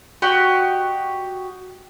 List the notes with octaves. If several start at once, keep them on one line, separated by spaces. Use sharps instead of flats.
F#4 G4 D#5